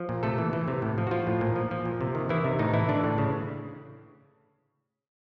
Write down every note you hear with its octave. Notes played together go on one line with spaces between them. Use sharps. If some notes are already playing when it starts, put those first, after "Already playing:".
Already playing: F3
A#2
C3 A3 A4
E3
E3
C3
A2
F3
F#4
F3 F4
A2
A#2
F3
F3
A#2
C3
D#3
D#3 E3 E4
C3
A2 D#3 D#4
E3 E4
D3 E3 D4
A2
C#3